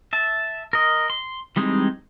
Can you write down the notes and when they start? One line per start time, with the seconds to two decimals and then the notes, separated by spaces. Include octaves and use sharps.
0.13 E5 A5
0.73 A#4 D#5
1.10 C6
1.56 E3 G3 G#3 C4 D#4